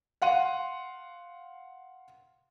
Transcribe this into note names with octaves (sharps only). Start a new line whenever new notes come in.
F5 F#5 C6 D#7